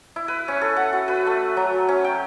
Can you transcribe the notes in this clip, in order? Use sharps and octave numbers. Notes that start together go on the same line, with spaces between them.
E4
B4
C#4
A4
F#5
F#4
B4
A3
F#3
C#4
G5